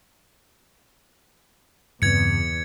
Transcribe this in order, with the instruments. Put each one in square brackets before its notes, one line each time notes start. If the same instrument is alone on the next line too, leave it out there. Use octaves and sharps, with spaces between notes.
[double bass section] E2 [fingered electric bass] G2 C#3 C4 [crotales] G#6 C#7